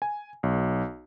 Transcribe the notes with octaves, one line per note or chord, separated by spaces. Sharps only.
G#5
B1